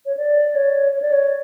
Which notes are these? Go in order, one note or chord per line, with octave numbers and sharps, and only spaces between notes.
C#5
D5
C#5
C#5
D5
C#5